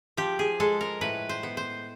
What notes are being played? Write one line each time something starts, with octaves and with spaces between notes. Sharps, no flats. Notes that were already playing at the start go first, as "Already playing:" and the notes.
F3 G4
G#4
G#3 A4
A#4
A2 B4
C5
B3
C5